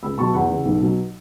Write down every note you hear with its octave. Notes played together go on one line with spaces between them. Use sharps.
C#2 B5 E6
B2 F#3 A5 C#6
E2 F#5 B5
C#3 E3
B1
B2 F#3